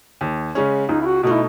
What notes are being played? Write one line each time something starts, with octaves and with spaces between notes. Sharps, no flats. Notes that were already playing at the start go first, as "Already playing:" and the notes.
D#2
C#3 G#3 C#4
C#2 D#4
E4
F#4
B2 A3 D#4 F#4
E4